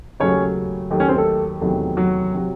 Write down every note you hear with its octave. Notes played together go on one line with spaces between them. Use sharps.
D#2 C#3 F#3 A3 C#4 C#5
D#2 D#3 F#3 A3
C#4 C#5
C4 C5
A3 A4
E2 C3 D#3 F#3 A3
F#3 F#4
C3 F#3